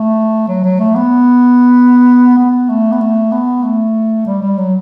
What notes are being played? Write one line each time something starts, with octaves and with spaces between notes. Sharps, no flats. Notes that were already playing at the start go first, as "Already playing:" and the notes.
Already playing: A3
F#3
F#3
A3
B3
B3
A3
B3
A3
B3
A3
G3
G3
F#3